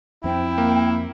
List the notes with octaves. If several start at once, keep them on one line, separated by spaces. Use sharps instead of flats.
F2 C4 E4 G5
A#3